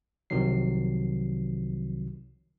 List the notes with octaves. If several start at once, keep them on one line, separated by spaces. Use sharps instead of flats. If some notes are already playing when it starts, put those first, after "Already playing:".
C2 C3 D#3 F3 F#3 C7